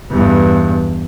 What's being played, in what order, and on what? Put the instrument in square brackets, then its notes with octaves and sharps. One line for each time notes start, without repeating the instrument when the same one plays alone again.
[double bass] E2 G2